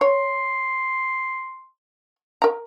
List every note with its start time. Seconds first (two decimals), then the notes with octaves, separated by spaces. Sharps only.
0.01 C#5 C6
2.42 A#4 A#5